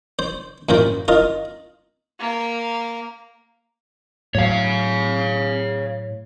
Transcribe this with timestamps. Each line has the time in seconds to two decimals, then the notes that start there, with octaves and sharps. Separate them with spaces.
0.19 C5
0.69 F#2 A#2 A#4 C5
1.08 F4 A#4 D#5
2.19 A#3
4.35 A2 F#3 C#5 F5